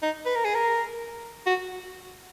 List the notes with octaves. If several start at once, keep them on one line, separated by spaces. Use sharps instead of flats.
D#4
B4
A#4
G#4
A#4
F#4